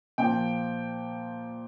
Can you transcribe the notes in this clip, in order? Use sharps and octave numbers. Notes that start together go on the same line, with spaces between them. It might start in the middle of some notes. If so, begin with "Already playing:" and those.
A#2 F3 G5